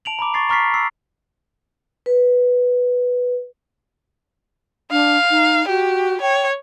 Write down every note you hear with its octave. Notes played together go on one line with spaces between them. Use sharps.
A5 D7 F7 F#7
A#5 B5 D6
C#6 A6 C7
A#5 C#6 F6 A6 B6 C7
E6 C7
B4
D4 F5
D#4
F#4 G4
C#5 G5